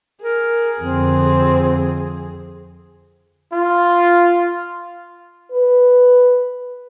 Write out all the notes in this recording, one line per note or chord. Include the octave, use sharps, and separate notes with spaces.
G#4 A#4
F2 D3 C4
F4
B4